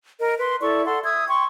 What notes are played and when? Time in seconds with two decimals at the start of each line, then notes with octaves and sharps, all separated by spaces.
0.20 A#4 D#5
0.38 B4 C6
0.61 E4 A4 D5 C#6
0.86 A4 F#5 C6
1.03 E5 D#6 E6 G#6
1.28 G5 C6 C#6